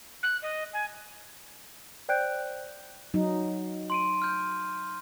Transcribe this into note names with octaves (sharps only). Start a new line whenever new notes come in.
F#6
D#5
G#5
C5 D5 G5 F#6 G6 D7
F#3 D#4
C6 D7 D#7
F6 G6